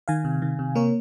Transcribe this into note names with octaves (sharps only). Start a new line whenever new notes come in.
D#3 F5 G#5
C3
D#3
C3
A#3 A#4 C#5